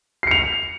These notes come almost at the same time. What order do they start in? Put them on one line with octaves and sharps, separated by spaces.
C7 C#7 F7